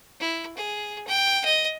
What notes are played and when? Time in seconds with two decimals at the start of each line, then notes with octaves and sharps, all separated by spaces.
0.20 E4
0.57 G#4
1.07 G5
1.45 D#5